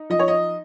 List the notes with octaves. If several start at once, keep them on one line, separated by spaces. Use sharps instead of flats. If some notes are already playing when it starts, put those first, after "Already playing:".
Already playing: D#4
F3 D#5
C#5
D#5